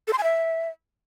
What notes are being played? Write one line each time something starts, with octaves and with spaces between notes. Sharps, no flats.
A4
C6
G#5
E5